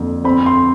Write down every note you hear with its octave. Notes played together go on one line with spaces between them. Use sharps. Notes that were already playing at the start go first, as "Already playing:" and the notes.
Already playing: F2 D3 A#3
C4 B5
C6